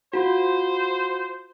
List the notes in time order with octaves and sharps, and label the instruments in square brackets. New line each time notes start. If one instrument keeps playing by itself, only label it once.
[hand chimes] F4 F#4 [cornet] C5